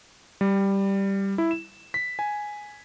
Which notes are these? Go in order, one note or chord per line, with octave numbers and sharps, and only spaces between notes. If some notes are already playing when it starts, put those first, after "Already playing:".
G3
E4
E7
B6
G#5